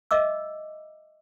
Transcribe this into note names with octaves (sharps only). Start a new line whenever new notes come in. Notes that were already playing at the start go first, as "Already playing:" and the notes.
D#5 E5 D6 E6